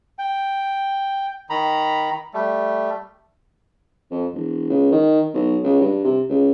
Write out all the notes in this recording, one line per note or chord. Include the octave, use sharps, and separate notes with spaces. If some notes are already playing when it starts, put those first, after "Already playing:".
G5
D#3 A#5 B5
G3 A3
F2
E1
C#2
D#3
B1
C#2
G2
C3
C#2